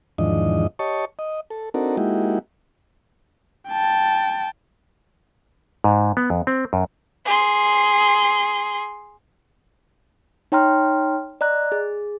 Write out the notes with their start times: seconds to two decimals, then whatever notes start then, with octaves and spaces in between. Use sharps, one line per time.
0.18 E2 G#2 D#3 F3 D4 D#5
0.79 G4 C#5 D#5 A5 C#6
1.19 D#5
1.50 A4
1.74 C4 D4 D#4 F#4 A4 A#4
1.97 G#3 A#3 D#4 E4 F#4 G4
3.69 G5 A5
5.84 G#2
6.17 B3
6.30 F2
6.47 C4
6.73 F#2
7.25 G#4 C6
10.52 D#4 C#5 G5 A#5 C6 F6
11.41 D5 D#5 A#5 F#6
11.72 G#4